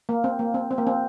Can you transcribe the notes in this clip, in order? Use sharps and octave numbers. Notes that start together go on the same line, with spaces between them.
A#3
C4
A#3
C4
C4
A#3
C4